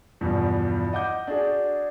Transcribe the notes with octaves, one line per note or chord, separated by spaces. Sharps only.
E2 G2 B2 F3
D#5 F#5 D6 G6
D4 F#4 G#4